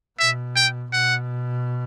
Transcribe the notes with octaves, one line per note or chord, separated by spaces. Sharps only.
B2 E5
G5
B2 F#5